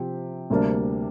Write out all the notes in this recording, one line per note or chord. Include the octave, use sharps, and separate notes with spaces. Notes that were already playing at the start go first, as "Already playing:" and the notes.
Already playing: C3 F3 C4 G4 C5
D2 C3 G3 A#3 D4